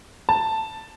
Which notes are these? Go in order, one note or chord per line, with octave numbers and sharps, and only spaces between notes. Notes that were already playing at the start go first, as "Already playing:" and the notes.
A5